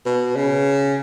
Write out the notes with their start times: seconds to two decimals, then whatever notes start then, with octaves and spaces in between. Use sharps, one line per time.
0.06 B2
0.35 C#3